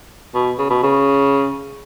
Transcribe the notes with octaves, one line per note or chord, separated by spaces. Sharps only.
B2
C#3
B2
C#3